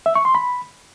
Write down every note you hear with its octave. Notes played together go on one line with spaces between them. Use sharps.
E5
C#6
C6
B5